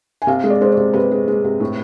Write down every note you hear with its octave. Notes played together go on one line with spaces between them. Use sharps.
G#5
C3 F5
G#3
D5
G#3 C5
C3 D5
C3 B4
G#3
G#3
C3
A2